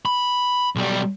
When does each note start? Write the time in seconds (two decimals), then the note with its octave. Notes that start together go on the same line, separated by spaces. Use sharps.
0.05 B5
0.76 B1 G3